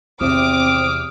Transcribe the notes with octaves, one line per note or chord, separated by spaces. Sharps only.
E2 C3 C4 D6 D#6 F6 D7